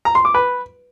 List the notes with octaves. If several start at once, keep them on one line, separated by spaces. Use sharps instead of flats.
A#5
C6
D6
B4